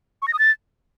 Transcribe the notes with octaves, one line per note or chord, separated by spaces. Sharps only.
C#6
A#6
D#6
A6